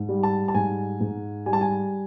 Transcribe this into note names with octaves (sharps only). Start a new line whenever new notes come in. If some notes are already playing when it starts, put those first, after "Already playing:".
Already playing: G#2
G3
A5
A5
G#2 G#5
G#2
G3 G#5
A5
G#5